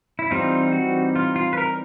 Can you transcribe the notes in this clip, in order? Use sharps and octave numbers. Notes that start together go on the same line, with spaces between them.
E4
E3 G3 C4 D#4 F4
F#4
F4
F4
B4
A#4